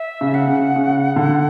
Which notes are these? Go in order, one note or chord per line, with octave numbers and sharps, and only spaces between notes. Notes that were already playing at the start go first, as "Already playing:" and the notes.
Already playing: E5
C#3
F#5
C#3
C#3
D3